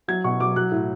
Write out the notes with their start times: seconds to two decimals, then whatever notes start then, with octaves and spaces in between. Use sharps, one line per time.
0.08 F#3 G#6
0.24 B2 C#6
0.40 F#3 D6
0.56 F#3 F#6
0.71 A2